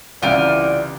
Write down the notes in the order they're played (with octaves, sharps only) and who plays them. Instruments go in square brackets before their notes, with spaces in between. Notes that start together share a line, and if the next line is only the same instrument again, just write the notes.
[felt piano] C2 C#3 E3 [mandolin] F4 G5 F6 [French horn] D5